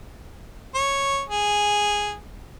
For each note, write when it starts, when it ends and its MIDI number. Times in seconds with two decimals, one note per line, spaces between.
0.75 1.22 73
1.29 2.17 68